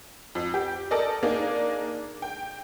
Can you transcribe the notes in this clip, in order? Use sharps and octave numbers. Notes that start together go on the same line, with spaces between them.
F2
G4
A4 A#4 D5 D#5
A#3 D4 D#4 G#4
G5